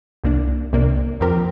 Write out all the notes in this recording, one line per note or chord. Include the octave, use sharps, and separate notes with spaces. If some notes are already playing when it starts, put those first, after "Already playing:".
C2 C3 A#3 D4
C2 C3 A#3 D4
F2 F3 C4 G4 A#4